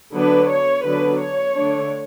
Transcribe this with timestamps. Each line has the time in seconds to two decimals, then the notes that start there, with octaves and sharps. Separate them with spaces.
0.14 D3 F#3 B3 D4 B4
0.50 C#5
0.85 D3 F#3 B3 D4 B4
1.21 C#5
1.56 D3 A3 D4